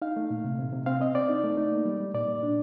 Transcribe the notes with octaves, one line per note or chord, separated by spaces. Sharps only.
D#4 F5
A3
A#2
C3
C3
C3
C4 F5
C4 D#5
C4 D5
D#4
A3
D#4
A#3
G3
G3
A#2 D5
A#2
D4